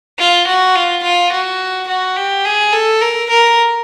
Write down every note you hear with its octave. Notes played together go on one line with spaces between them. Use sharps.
F4
F#4
F4
F4
F#4
F#4
G4
G#4
A4
A#4
A#4